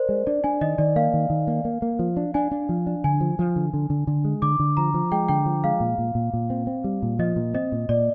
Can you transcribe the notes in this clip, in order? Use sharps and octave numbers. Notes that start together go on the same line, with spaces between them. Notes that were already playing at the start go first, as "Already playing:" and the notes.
Already playing: A#4 C5 D5
G#3
D4 D5
D4 G#5
D#3 D#5
D#3 D5
A#3 F5
D#3
D#3
A#3
A#3
A#3
F3
D4
D4 G#5
D4
F3
D4
D3 G#5
F3
F3
D3
D3
D3
D3
G#3
D3 D6
D3
F3 A#5
F3
G#3 G5
D3 G5
F3
G#3 F5
A#2
A#2
A#2
A#2
C4
C4
G3
A#2
F3 D#5
A#2
C4 D#5
A#2
A#2 D5